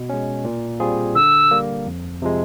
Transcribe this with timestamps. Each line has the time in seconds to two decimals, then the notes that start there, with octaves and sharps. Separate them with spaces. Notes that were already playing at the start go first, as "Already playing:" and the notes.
Already playing: B2
0.09 G#3 C#4
0.45 A#2
0.80 G3 C4 F4 G#4
1.15 D3 E6
1.51 G3 A#3
1.87 F2
2.22 C3 F3 G#3